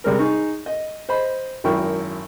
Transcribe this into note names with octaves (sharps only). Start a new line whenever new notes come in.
C3 G3 G#3 A#4
D#4 G#4 C#6
D#5
C5 D#5 B5
G#1 F#2 E4 A#4 G5 C#6